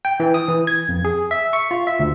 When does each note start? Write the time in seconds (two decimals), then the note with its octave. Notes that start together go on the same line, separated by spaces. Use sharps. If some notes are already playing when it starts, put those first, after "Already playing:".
0.05 G5
0.20 E3
0.34 D#6
0.48 E3
0.67 G#6
0.89 F2
1.05 G#4
1.31 E5
1.53 C#6
1.71 F4
1.87 E5
1.99 D2